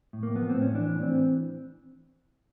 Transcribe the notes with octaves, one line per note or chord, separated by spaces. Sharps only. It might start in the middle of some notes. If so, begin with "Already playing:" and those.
A2
A#3
F3 B3
C4
A2
C#4
E3 D4
E3
C4